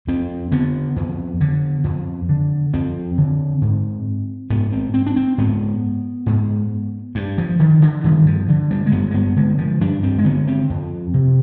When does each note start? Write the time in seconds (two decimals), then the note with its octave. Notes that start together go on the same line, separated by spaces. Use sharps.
0.07 F2 C4
0.52 D3 B3
0.96 F2
1.41 D3
1.84 F2
2.29 D3
2.74 F2 C4
3.18 D3
3.62 G#2
4.50 G#2 B3
4.72 C4
4.94 C4
5.06 D4
5.16 C4
5.38 G#2 B3
6.26 G#2
7.15 G2
7.38 F3
7.60 D3 D#3
7.82 D3
8.04 G2 D#3
8.26 F3
8.49 D3
8.71 G3
8.86 G#3
8.92 G2 B3
9.11 G#3
9.14 B3
9.36 D3 G#3
9.58 F3
9.80 G2 D4
10.03 C4
10.18 G#3
10.24 D3 B3
10.47 C4
10.70 F2
11.14 C3